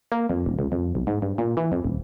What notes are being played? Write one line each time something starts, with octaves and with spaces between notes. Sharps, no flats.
A#3
F2
D#1
C#2
F2
B1
G#2
G2
A#2
E3
F2
D#1